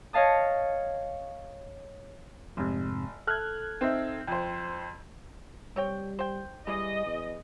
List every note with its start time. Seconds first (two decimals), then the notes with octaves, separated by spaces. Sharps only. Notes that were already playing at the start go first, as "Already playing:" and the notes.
0.13 C#5 D#5 F5 A5 D#6
2.57 F1 F2 G#2 C3
3.27 A4 F6 F#6 G#6
3.81 C4 D#4 E5
4.27 F2 C5 G5
5.76 G3 C4 C#5 G5
6.19 C5 G5
6.67 E3 G3 G#4 D#5
7.06 E2